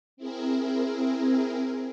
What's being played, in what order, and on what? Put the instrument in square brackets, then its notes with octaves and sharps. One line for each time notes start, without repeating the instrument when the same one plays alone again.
[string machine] C4 E4 G#4 A#4